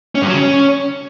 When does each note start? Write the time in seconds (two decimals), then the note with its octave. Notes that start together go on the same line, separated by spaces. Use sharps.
0.15 C#4
0.21 G2
0.27 F#3
0.33 C#3
0.40 C#4